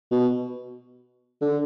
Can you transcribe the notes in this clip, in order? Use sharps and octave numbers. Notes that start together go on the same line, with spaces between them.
B2
D3